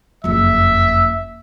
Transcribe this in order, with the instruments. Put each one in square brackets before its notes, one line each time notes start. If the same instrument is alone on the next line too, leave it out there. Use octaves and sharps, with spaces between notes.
[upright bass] F#1 F2 [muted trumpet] E5